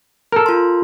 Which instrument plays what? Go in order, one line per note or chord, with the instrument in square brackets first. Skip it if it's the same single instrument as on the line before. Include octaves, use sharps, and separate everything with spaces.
[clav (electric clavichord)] A4 A#4
[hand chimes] F4 C6